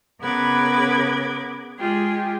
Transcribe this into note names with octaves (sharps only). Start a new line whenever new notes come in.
C#3 B3 A#4 B4 D6 G#6
G#3 F4 G4 G#4